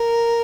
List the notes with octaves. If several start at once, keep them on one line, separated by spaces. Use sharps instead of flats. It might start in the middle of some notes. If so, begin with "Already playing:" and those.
Already playing: A#4